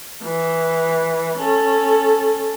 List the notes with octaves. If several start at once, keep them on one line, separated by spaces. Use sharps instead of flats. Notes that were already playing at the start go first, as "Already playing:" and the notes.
E3
C#4 A4